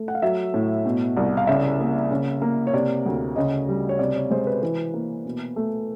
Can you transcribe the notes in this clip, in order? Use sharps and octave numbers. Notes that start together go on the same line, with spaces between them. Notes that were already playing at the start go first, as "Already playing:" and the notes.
Already playing: A3
F#5
F5
F#3 E5
A2
B2
C2
F5
C#3 E5
A#3
C#3
A#3
C#5
C3 D5
D2
C#3 D#5
G3
C#5
C3 D5
C#5
G#3 C5
B4
E3 B4
A#3
B2
A3